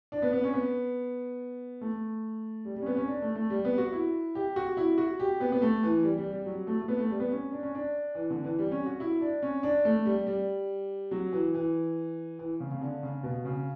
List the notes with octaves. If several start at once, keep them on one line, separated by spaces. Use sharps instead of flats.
D4
B3
B3
C#4
B3
A3
G3
G3
C#4
B3
C#4
D4
A3
A3
G3
B3
F#4
E4
G4
F#4
E4
F#4
G4
B3
B3
A3
E3
G3
G3
G3
F#3
A3
A3
B3
A3
G3
B3
C#4
D4
C#4
D4
E3
D3
E3
G3
C#4
F#4
E4
D4
C#4
D4
A3
G3
G3
F#3
E3
E3
E3
C#3
C#3
D3
C#3
B2
C#3